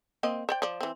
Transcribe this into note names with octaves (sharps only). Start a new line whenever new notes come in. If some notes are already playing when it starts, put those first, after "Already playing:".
A#3 C4 D#5
C5 D5 G5
F3 D5
E3 C4